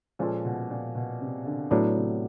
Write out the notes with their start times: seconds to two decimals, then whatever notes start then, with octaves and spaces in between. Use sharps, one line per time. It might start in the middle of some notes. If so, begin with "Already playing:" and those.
0.19 A#2 F3 G#3 C#4 F4 A4
0.45 B2
0.70 A#2
0.95 B2
1.20 C3
1.45 D3
1.71 A2 F#3 B3 D4
1.96 C3